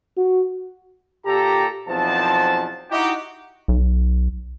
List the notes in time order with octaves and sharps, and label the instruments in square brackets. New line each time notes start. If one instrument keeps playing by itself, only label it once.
[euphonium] F#4
[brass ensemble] A#2 G4 A4 A#5
B1 E2 F3 C4 A5
D#4 E4 F#4 G4
[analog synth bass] B1